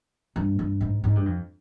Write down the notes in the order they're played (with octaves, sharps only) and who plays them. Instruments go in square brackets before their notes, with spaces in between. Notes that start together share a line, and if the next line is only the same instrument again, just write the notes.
[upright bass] G2
G2
G#2
G#2
G2
F2